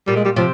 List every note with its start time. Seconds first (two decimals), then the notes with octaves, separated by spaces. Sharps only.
0.07 A#2 G3
0.16 G#3
0.25 G3
0.36 C3 F3